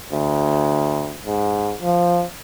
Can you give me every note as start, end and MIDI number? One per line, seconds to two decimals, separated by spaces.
0.12 1.16 38
1.26 1.74 44
1.82 2.23 53